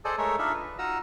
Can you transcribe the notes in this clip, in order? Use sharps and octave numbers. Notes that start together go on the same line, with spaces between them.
G#4 A4 C5 D5 D#5
G#3 A3 A#4 C#5 E5
D4 D#4 F4 E5 B5
B4
D#4 F4 F#4 D#5 A#5 E6